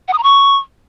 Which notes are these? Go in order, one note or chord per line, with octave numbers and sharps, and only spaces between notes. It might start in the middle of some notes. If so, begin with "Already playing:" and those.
F#5
D#6
A#5
C#6